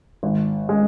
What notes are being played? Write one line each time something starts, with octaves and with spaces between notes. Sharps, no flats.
G#1
G#3